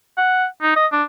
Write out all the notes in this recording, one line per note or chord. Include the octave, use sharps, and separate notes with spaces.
F#5
D#4
D#5
D4